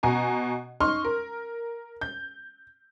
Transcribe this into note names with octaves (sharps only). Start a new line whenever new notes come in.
B2 G#5 A#5
D#4 C6 C#6 F6
A#4
G6